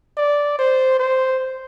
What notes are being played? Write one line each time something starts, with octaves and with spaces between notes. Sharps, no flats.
D5
C5
C5